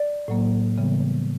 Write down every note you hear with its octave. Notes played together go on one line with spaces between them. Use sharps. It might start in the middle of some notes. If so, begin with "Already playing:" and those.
Already playing: D5
A2 F#3 A#3
C#3 E3 G3 B3